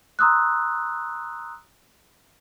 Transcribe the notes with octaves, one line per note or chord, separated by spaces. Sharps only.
A#5 C6 D#6 E6 F#6